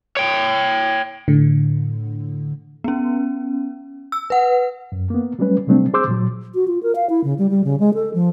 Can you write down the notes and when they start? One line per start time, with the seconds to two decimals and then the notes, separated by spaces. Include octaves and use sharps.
0.17 C#5 G5
1.28 A2 D3
2.84 B3 C#4
4.12 E6
4.30 B4 F#5
4.92 F#2
5.10 A#3 B3
5.39 F#3 G3 A3 C#4 B4
5.67 C3 F#3 G3 A3 C4 D4
5.94 G#4 C5 C6 D6 E6 G6
6.08 A#2 F#3
6.55 F#4
6.68 F4
6.83 A#4
6.95 F5
7.10 E4
7.24 C#3
7.39 G3
7.50 G3
7.64 C#3
7.79 G#3
7.94 A4
8.14 F3